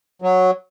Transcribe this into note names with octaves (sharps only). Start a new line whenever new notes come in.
F#3